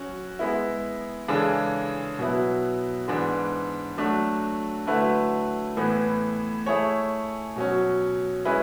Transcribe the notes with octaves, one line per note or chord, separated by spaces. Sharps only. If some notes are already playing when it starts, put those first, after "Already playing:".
Already playing: F#3 C#4 F#4
G#3 B3 E4
C#3 E3 G#3 D4 A4
B2 F#3 B3 E4
G#2 E3 B3 D4
F#3 A3 D4 F#4
D3 F#3 A3 E4 B4
A2 E3 B3
A3 E4 G#4 C#5
B2 F#3 C#4
G#3 C#4 E4 B4